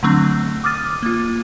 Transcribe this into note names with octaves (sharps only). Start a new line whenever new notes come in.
D3 F#3 A3 C4 D4
D6 D#6 F6 A6 D#7
A#3 F4